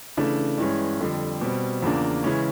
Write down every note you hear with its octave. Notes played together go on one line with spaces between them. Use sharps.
C#3 E3 A3 D4
G2 E3 G#3 C#4
F2 D3 G3
B2 G3 C4
E2 C#3 F3 A#3 D4
C#3 E3 G#3 C#4